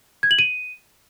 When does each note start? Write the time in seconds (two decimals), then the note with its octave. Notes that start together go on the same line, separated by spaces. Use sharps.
0.23 G#6
0.31 F#7
0.39 D#7